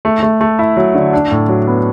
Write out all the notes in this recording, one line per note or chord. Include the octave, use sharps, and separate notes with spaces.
A3
A3
A3
E4
F#3
D3
D4
A2
F#3
B3